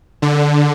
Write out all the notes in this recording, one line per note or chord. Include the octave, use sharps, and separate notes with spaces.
D3